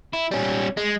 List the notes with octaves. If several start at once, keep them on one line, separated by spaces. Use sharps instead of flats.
E4
G3 C#4
G#3